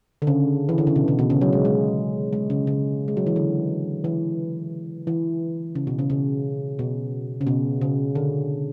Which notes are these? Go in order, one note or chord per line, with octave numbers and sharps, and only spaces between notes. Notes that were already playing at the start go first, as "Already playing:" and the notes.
D3
C#3
E3
D3
C#3
B2
B2
B2
C#3
F#3
G#3
G#3
G#3
C#3
C#3
G#3
F#3
E3
D3
E3
E3
C#3
B2
C#3
C#3
B2
C#3
B2
C#3
D3